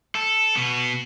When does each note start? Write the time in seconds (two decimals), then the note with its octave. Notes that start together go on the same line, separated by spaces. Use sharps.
0.15 A4
0.56 B2 B3